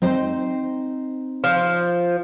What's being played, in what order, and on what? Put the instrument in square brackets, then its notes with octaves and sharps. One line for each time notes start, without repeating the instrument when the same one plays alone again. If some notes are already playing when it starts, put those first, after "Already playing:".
[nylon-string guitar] C4 D#4 C5
[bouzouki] F3